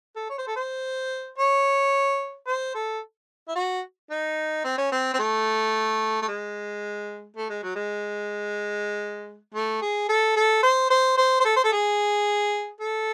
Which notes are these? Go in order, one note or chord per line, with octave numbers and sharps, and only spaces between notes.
A4
C#5
C5
A4
C5
C#5
C5
A4
E4
F#4
D#4
C4
C#4
C4
C4
A3
A3
G#3
A3
G#3
F#3
G#3
A3
G#4
A4
A4
C5
C5
C5
C5
A4
C5
A4
G#4
A4